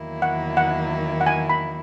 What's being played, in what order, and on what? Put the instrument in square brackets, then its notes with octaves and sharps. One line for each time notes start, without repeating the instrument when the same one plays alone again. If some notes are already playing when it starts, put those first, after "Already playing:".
Already playing: [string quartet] E2 D#3 F#3 A#3 E4
[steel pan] F#5
F#5
F#5
G#5
B5